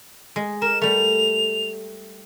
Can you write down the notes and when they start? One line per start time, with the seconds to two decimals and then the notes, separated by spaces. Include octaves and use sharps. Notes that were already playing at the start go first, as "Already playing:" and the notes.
0.36 G#3
0.62 A#4 E7
0.82 G3 A3 F7